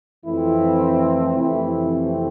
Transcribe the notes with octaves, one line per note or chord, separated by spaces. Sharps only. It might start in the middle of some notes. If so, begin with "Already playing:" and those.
F2 E3 A3 C4 E4
F2 C3 E3 A3 C4 E4
C4